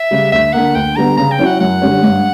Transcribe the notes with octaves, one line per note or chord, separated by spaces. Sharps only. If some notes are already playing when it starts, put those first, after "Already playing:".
Already playing: E5
C#3 G3
D2 E5
D3 A#3 F#5
D2 G5
D3 G3 B3 A#5
C#3 A#5
G5
F#3 C#4 E4
F#5
F#2 F#5
D3 G3 C#4
G2